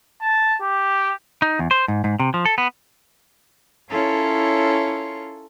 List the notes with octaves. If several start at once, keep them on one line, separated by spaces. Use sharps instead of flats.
A5
G4
D#4
E2
C5
G#2
G#2
C3
F3
A4
B3
C#4 E4 F4 A4 A#4 C#5